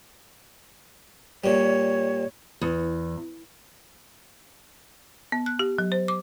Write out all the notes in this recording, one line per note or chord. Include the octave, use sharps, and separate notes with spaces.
A#2 G3 C#5
E2
B3
F#6
G4
F#3
C5
D6